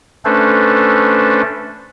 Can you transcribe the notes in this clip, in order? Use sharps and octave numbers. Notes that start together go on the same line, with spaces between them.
A3 C#4 D4 A4 B4 C5